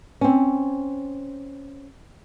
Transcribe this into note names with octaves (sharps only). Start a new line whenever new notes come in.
C4 C#4